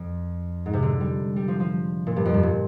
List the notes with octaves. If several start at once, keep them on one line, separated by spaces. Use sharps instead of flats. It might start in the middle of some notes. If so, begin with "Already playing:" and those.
Already playing: F2
G#2
C3
D3
G3
G3
F3
F3
A#2
G2
F2
G2
A#2